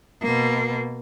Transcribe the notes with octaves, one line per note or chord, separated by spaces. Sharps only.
B2 A#3